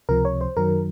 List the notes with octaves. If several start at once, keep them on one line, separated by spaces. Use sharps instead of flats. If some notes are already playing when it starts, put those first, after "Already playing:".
C#2 C3 F3 A#4
C#5
C5
F#2 D#3 F#3 A#4